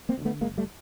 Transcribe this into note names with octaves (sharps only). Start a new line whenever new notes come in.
A#3 C4
D2
D3 A3 B3
F#1 G#3 A#3
G3 A3